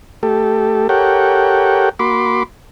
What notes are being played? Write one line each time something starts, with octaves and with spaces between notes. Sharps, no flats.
A3 G4 A4
G4 A4 A#4 C#5 F#5 G5
A#3 F#4 B5 C6 D6